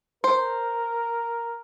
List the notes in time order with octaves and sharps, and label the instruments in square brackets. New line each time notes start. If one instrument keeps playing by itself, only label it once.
[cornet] A#4 [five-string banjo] C5